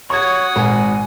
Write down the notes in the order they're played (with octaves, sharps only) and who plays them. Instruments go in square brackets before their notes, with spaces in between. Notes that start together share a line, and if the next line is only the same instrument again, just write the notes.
[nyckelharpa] F#4 D#6 [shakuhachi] C#5 [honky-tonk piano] C#6 G#6
[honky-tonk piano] G#1 [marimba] A#2 [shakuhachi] G#5